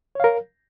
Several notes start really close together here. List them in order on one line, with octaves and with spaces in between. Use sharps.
C#5 F5 A#4